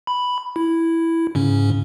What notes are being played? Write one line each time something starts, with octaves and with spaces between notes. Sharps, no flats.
B5
E4
G#2 C#3 C#4